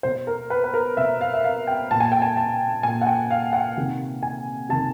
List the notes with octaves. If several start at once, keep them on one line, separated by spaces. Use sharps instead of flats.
B2 C5
A#4
B4
B4
A#4
B2 E5
F5
E5
F5
G5
A#2 A5
G#5
G5
G#5
A5
A#2 G#5
F#5
G5
F5
F#5
C3 D#3
G#5
C3 D#3 A5